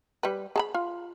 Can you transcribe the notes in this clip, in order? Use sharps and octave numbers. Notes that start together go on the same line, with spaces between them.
G3 B4
G#4 A5 B5
F4